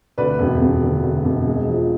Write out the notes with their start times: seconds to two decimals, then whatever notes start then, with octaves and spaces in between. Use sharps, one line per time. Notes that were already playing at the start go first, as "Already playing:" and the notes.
0.18 D2 B4 D5
0.39 E1
0.61 E1
0.83 D3
1.03 D2
1.25 E1
1.47 G#3
1.68 F3